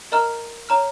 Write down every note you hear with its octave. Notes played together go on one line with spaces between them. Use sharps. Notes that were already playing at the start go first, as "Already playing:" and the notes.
A#4 D#5 A#5 F6
C#5 A#5 F6